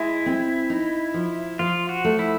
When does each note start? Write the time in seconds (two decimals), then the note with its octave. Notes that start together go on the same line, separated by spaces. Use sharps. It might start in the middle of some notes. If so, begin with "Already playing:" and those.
Already playing: G#3 E4
0.26 C4
0.70 D#4
1.14 F3
1.59 F3 F4
1.89 F#4
2.05 A3
2.19 E4